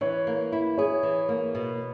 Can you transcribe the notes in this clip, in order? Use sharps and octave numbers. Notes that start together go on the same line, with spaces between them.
E3 C#5
A#3
E4
G#4 C#5
E3
A#3
B2